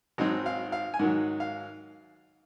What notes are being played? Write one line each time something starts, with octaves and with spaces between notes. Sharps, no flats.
G#1 G#2 F#3 C4 D#4 D#5
F5
F5
G#5
G#2 D#3 F#3 F#5
F5